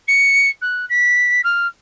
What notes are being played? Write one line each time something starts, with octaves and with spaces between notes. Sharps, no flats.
C#7
F#6
B6
F6